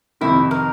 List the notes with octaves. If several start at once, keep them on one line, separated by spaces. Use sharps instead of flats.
F2 C3 D#3 E4
A#4